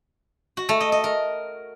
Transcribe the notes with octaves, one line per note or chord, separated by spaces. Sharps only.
F#4
A3
D#5
D#5
A#4